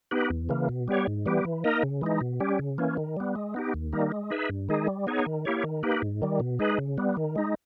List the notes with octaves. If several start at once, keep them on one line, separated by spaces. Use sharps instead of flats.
B3 D#4 G4 B4
E2
C#3 E3 A#3
B2
G3 B3 G4 C#5
G#2
E3 G3 B3 G4
E3
A#3 D#4 A#4 D#5
C#3
E3 G#3 D#4
B2
G3 C#4 G4
C#3
E3 A#3 C#4
D#3
G3 B3
G#3
B3 D#4 G4
D#2
D#3 G3 A#3 D#4
G#3
D#4 G#4 B4 E5
G2
D#3 G#3 D#4 G#4
G3
B3 D#4 G#4 C#5
D#3
A#3 E4 G4 C#5
D#3
A#3 D#4 G4 B4
G#2
D#3 G3
B2
G#3 D#4 G#4 B4
C#3
G3 B3
D#3
G#3 D#4